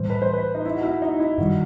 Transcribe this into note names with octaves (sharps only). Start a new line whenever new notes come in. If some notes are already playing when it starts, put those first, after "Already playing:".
Already playing: A2 E3 G3 C5
B4
C5
B4
D#4
E4
F#4
E4
D#4
E4
G2 D#3 G3 F#4